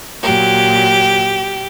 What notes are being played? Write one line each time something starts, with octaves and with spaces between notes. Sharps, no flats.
A#2 F#3 G4